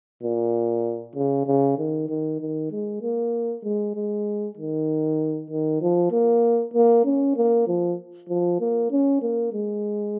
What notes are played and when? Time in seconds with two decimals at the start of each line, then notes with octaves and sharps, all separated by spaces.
0.23 A#2
1.16 C#3
1.47 C#3
1.78 D#3
2.09 D#3
2.40 D#3
2.71 G#3
3.02 A#3
3.64 G#3
3.95 G#3
4.57 D#3
5.50 D#3
5.81 F3
6.11 A#3
6.74 A#3
7.05 C#4
7.37 A#3
7.67 F3
8.29 F3
8.60 A#3
8.92 C#4
9.22 A#3
9.53 G#3